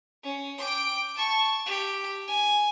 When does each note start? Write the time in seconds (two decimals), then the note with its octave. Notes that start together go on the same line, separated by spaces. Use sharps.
0.23 C#4
0.58 G5 D6
1.15 A5 C#6
1.66 G4
2.28 G#5